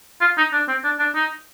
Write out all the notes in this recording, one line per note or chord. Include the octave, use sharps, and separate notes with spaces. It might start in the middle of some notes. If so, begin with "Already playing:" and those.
F4
D#4
D4
C4
D4
D4
D#4